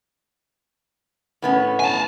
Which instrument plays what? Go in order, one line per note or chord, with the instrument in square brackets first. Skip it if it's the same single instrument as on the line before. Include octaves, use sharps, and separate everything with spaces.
[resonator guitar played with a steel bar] A2 B3 C#4
[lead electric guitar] G#5 A5